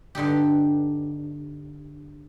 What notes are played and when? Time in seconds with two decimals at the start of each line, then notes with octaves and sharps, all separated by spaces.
0.15 G2 D3 D#4 G4